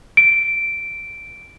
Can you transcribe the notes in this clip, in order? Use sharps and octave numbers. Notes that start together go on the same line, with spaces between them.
D7